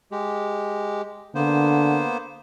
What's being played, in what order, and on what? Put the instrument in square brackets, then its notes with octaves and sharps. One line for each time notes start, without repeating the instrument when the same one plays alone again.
[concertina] G#3 G4
[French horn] D3 [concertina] A#3 B3 C5